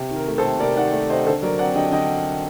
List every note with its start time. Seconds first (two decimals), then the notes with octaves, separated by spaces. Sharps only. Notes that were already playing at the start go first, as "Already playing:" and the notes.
Already playing: C3
0.11 D#3
0.16 A#4
0.28 A3
0.38 A4 C5
0.44 C3
0.60 C3 A#4 D5
0.76 D#3 D5 F#5
0.93 A3 A#4 D5
1.09 C3 C5 D#5
1.26 D3 A4 C5
1.42 F#3 A#4 D5
1.59 C4 D5 F#5
1.76 D3 D#5 G5
1.92 D3 D#5 G5